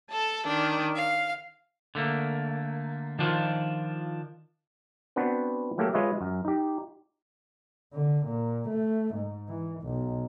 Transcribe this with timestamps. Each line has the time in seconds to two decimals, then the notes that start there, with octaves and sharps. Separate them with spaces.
0.11 A4 A5
0.47 D#3 D4
0.96 F5
1.95 D3 A3 A#3
3.19 D#3 F3 D4 F4
5.16 B3 C4 D4 F#4 B4
5.78 F#3 A3 A#3 G4 A4
5.93 G#3 F4 B4 C#5 D#5 E5
6.21 F#2
6.45 D#4 G4
7.93 D3
8.26 A#2
8.69 A3
9.14 G#2
9.49 E3
9.81 B1